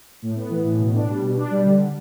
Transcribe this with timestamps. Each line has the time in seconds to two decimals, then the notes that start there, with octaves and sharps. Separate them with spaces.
0.22 A2
0.36 B3
0.50 E3
0.64 A2
0.79 B2
0.94 D4
1.08 G3
1.21 B2
1.36 D4
1.51 G3
1.65 D3